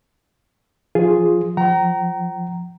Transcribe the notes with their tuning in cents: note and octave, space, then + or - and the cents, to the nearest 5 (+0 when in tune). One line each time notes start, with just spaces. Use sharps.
F3 -10 F4 +0 G#4 +0
F3 +0 G5 -45 A#5 +0